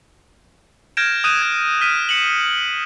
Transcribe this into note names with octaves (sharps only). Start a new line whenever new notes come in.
F6 G6 G#6 A#6 D7 E7
D#6 F#6 G6 D#7 E7
G#6
F6 B6 D#7
C#7 E7 F#7